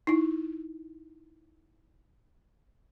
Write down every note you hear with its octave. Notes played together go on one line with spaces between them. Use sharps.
D#4 E4